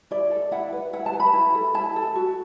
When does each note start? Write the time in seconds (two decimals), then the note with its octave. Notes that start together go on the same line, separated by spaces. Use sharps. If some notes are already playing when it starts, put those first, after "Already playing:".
0.11 E4 D5
0.31 A4
0.51 E4 F#5
0.72 B4
0.93 E4 F#5
1.06 A5
1.13 B4
1.20 B5
1.33 E4
1.55 A4
1.74 E4 A5
1.96 A4
2.15 F#4